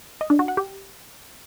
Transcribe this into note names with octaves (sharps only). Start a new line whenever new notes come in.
D#5
D4
F#4
F#5
G4